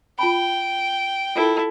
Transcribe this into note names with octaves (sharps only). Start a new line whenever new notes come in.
F4 G5 A5 B5
E4 F4 A4 A#4